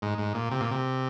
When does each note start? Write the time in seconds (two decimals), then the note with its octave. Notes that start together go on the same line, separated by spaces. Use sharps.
0.02 G#2
0.18 G#2
0.34 A#2
0.51 C3
0.61 A#2
0.71 C3